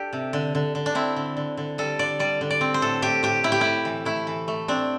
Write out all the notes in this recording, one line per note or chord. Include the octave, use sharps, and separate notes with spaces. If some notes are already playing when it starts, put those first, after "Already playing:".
Already playing: D4 G4 A4
C3
D3
D3
D3
D4
C4 E4
D3
D3
D3
G3 A4
D3 D5
G3 D5
D3
D5
C4
C5
A2 A4
A2 G4
A2 G4
A2 E4
G4
A2 E4
E3
A3 E4
E3
A3
C4 D4